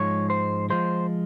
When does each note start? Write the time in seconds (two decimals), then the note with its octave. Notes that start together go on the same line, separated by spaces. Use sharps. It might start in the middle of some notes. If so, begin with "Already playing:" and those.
Already playing: G#2 F3 G#3 C#5
0.30 C5
0.70 F3 G#3 C5